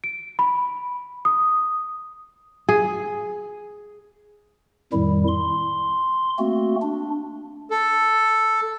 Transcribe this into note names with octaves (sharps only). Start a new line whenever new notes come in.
D7
B5
D#6
G#4
F2 A2 D#3 G3 E4
C6
A3 A#3 C4 F#4
D4
A4